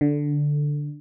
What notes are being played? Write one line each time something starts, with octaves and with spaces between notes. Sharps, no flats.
D3